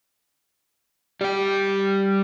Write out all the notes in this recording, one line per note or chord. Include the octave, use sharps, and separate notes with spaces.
G3 G4